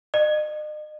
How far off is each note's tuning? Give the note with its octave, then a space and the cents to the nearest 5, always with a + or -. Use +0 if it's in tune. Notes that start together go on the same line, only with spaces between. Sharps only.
D#5 -40